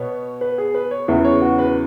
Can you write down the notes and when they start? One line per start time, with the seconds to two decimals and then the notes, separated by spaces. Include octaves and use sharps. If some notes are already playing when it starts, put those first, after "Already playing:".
Already playing: B2 B3 C#5
0.41 B4
0.58 G#4
0.74 B4
0.91 C#5
1.08 E2 C#3 E3 B3 E5
1.25 C#5
1.42 F#4
1.59 B4